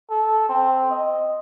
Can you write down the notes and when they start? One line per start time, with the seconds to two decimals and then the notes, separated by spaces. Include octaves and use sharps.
0.10 A4
0.49 C4
0.91 D#5